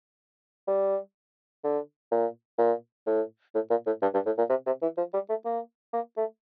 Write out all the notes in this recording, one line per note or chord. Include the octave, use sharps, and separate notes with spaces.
G3
D3
A#2
A#2
A2
A2
A#2
A2
G2
G2
A2
A#2
C3
C3
E3
F3
G3
A3
A#3
A#3
A3